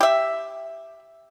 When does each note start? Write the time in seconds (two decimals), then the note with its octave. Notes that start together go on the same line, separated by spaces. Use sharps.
0.01 G4 E5